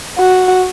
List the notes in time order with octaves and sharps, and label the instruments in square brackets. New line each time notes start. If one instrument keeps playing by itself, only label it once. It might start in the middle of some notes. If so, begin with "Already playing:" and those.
[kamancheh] F#4